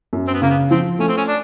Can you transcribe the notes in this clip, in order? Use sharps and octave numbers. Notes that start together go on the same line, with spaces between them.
F#2
C4
B3
C#3 A#3
B3
F3 C4
A3 C#4
C4
C#4
D4